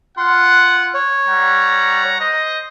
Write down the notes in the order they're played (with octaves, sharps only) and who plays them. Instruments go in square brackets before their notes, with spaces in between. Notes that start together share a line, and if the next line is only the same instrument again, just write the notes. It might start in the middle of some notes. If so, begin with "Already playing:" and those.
[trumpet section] F4 F#5 [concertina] C6
[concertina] C#5
[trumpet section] G3 F#5 A#5
C5 D#5